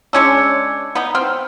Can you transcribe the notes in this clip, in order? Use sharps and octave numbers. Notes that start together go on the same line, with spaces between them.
G#3 C#4 D4 E6 G#6 C#7
B3 D#4
C4 F6